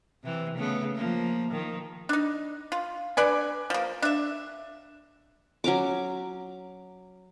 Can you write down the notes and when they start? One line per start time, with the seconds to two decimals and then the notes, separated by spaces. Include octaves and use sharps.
0.23 C3 E3
0.57 C#3 A3 B3
0.95 F3 A#3
1.51 D#3 F3
2.09 D4 D#4
2.72 F4
3.17 D3 B4 D5 G#5
3.70 F3 A#3
4.02 D4 E5
5.64 F#3 C#4 A#5 D6